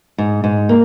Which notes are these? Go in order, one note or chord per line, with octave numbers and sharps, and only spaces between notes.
G#2
G#2
A#3